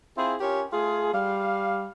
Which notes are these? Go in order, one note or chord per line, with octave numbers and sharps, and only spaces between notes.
C4 E4 F4 G#4
C#4 F4 G4 A#4 C#5
A3 F4 G#4
G3 F5